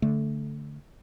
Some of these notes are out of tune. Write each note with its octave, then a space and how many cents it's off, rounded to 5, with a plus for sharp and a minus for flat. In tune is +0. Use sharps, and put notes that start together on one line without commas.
D3 -15 A3 +0